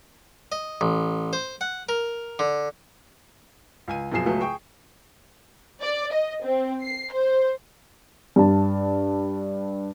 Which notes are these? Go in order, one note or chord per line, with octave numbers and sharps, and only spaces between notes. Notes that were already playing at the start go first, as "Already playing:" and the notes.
D#5
A1
C5
F#5
A#4
D3
C#2 G#5 D#7
F#2 B2 F3 G#4 C7 E7
C#2 F#3 A3 B3 G#4
G#4 G5 C#6
D5
D#5
C4
C7
C5
G2 D4 A5